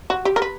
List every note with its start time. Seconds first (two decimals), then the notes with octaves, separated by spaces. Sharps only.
0.10 F#4
0.25 G4
0.36 A#4
0.42 B4